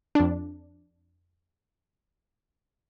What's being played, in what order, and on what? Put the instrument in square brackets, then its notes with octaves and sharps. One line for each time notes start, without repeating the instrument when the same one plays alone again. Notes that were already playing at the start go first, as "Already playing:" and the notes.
[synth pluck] F2 D4